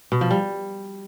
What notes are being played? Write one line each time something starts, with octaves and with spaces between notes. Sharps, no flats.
B2
F3
G3